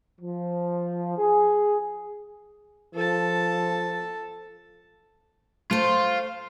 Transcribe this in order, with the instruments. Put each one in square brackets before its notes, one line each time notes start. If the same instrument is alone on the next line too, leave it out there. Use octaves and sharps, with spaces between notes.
[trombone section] F3
G#4
[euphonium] F3 [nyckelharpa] A4 A5
[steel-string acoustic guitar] A3 C5 [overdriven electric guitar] F4